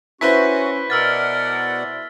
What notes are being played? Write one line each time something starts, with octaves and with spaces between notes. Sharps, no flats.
C#4 E4 F#4 B4 C5 B6
B2 A#4 D5 F#5 E6 F6 A6